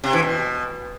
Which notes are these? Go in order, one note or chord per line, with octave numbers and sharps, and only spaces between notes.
C3
E3
B2